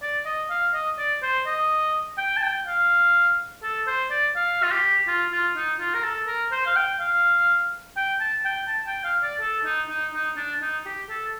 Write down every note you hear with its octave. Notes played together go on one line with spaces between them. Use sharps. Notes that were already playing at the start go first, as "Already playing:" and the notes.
D5
D#5
F5
D#5
D5
C5
D#5
G5
A5
G5
F5
A4
C5
D5
F5
F4
G4
F4
F4
D#4
F4
A#4
A4
A#4
C5
F5
G5
F5
G5
A5
G5
A5
G5
F5
D5
A4
D#4
D#4
D#4
D4
D#4
G4
A4